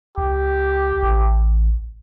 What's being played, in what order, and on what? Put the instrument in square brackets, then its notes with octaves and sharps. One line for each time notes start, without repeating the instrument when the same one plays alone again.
[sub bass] C#2 [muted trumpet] G4
[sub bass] A1